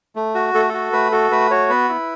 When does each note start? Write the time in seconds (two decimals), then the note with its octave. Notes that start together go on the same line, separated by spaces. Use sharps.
0.16 A3
0.35 F#4
0.54 A3 A4
0.69 A4
0.74 F#4
0.93 A3 B4
1.12 F#4 A4
1.31 A3 B4
1.51 F#4 C#5
1.69 B3 B4
1.89 E4